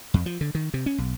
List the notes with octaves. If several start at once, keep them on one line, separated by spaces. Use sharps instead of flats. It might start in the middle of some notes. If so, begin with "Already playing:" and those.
F2
F3
D3
D#3
C3
C#4
B1